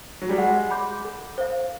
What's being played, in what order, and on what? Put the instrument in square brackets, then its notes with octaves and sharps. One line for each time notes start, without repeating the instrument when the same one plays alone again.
[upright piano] F#3
G3
[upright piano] G#3 [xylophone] F#5
[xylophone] B5 D6 G6
A4
C5 F5